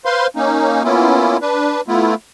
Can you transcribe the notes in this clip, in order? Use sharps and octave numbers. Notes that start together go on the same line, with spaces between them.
B4 C5 F5 C6
A#3 C#4 D#4
A#3 B3 C#4 E4 F4
D4 B4
A3 B3 E4 F4